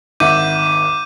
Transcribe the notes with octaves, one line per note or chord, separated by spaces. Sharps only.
G#1 E5 F#5 D6 G6 D#7